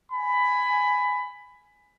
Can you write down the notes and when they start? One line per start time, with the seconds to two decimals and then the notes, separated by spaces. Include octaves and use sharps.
0.11 G#5 B5